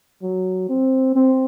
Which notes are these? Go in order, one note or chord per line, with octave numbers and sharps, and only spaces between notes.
F#3
C4
C4